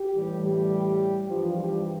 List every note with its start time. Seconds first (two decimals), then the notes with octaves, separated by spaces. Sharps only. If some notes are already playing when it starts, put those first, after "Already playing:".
Already playing: G4
0.15 A2 E3 G3
0.43 G3 G4
1.29 G2 E3 F3 G3 F4
1.57 G3 G4